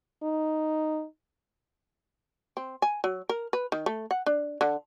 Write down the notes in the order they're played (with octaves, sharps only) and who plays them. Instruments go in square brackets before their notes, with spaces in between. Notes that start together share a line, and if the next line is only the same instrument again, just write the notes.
[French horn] D#4
[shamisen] C4
G#5
F#3
A#4
B4
D#3
A3
F#5
D4
D3